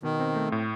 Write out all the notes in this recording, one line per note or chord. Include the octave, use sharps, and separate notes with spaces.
B2 D#3
C4
A3
A2